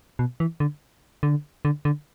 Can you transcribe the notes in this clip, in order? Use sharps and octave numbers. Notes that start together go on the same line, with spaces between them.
B2
E3
D3
D3
D3
D3